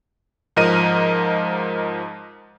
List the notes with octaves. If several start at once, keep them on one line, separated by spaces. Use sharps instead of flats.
G#2 F3 A#4 D#5 D#7